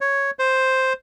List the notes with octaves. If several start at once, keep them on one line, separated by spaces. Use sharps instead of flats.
C#5
C5